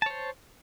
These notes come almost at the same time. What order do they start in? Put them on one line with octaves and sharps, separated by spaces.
A5 C#5 C5